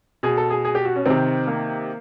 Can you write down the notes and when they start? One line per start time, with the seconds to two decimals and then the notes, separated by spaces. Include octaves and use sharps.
0.23 B2 G#4
0.37 A4
0.50 G#4
0.65 G#4
0.75 G4
0.85 F#4
0.96 C#4
1.06 C3 D#3 C4
1.47 A#3